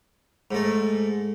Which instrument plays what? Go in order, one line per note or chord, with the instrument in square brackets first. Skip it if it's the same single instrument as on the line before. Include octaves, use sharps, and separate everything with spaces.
[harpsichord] G#2 A3